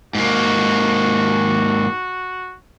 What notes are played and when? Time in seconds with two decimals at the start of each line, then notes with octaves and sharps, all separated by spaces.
0.15 G#2 A#3 F#4